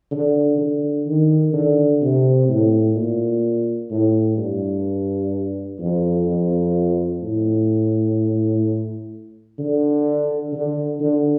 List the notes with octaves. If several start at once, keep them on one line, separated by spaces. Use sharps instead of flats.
D3
D3
D#3
D3
C3
A2
A#2
A2
G2
F2
F2
A2
D3
D3
D3